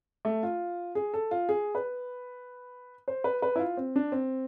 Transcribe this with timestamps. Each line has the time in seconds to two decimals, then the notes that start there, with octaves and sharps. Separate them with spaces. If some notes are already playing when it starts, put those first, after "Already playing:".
0.25 A3
0.43 F4
0.95 G#4
1.14 A4
1.31 F4
1.49 G#4
1.75 B4
3.08 C5
3.24 B4
3.42 B4
3.56 E4
3.59 F4
3.77 C4
3.96 D4
4.12 C4